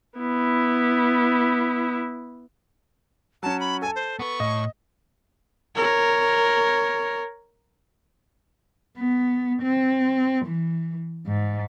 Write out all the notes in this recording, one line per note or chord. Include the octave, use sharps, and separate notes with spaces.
B3 E4
F#3 C#4 A5
B5
A4 G#5 A5
C5
B3 B4 C#6
A2 D#5
A#4 C#5
B3
C4
E3
G#2